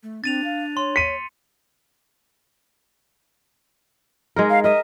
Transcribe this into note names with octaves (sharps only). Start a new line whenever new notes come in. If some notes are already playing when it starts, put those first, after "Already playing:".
A3
C4 D4 A6 D#7 F7
F5
C#5 C6
B6 C#7 D#7
G#3 D#4 A#4
F5
A#4 D#5 E5